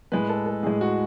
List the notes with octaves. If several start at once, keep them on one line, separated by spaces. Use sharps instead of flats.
A2 G#3 B4
A4
A4
A2 G#3 G#4
F#4